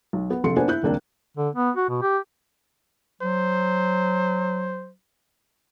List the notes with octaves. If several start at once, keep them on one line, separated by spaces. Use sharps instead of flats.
B1
B3
A#1 C3 A4 C6 C#7
A#3 B3 D4 C5 G#5
E4 F#6 G6
D#1 C#2 A#3 C4 D4
D3
B3
F#4
B2
G4
F#3 C5